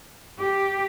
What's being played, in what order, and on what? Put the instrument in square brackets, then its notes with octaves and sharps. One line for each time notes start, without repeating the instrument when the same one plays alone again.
[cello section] G4